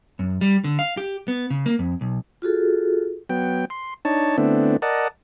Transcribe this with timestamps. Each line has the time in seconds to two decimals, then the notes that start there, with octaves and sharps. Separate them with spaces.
0.19 F#2
0.41 G3
0.64 D3
0.79 F5
0.97 G4
1.28 B3
1.50 C#3
1.66 A#3
1.79 F2
2.01 B1
2.42 F4 F#4 G#4 A4
3.29 F#3 B3 G5
3.70 C6
4.05 D4 D#4 C#5 A5
4.38 D3 A3 B3 C4 D4 E4
4.82 A#4 D5 D#5 F#5 A5